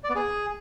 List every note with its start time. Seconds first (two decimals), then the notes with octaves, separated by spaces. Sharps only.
0.04 D5
0.10 B3
0.15 G#4